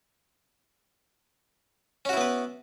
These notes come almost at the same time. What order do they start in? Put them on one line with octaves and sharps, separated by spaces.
C#4 F#4 E4 B3 B4